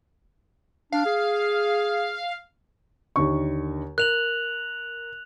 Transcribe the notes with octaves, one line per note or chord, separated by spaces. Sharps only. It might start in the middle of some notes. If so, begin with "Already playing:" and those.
D4 F5
G#4
D#2 D3 C#6
A#4 F#6 F7 F#7